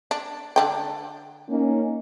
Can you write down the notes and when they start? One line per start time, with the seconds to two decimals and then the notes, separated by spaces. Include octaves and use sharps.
0.11 D4
0.56 D3 D4 G5
1.49 A#3 C#4 D#4